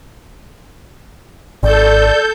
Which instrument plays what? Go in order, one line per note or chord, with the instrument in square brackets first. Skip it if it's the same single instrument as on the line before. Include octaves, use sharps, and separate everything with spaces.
[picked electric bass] G#1 [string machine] A4 G6 [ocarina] D5